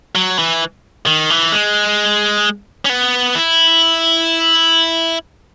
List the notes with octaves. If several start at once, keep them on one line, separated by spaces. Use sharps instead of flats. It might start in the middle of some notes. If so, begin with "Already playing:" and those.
F#3
E3
D#3
E3
G#3
C#4
B3
E4